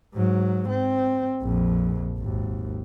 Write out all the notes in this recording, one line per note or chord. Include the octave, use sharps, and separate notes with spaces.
G#2 F#3
C4
A#1 F2
G#1 D#2